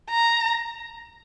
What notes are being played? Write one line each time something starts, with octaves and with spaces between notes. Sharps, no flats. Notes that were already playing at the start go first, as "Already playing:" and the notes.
A#5